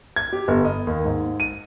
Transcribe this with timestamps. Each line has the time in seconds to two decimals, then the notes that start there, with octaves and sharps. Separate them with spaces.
0.16 G#6
0.33 G4
0.48 G1
0.65 D#5
0.87 D#2
1.05 G#2
1.40 D#7